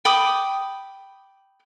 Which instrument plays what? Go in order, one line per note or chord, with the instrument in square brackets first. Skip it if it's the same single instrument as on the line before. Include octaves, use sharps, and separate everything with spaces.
[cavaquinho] G5 B5 D6 D#6